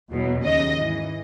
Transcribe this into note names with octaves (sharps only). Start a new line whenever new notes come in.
E2 B2 F#3
D#2 C#3 F#3 D#5
G#2 E3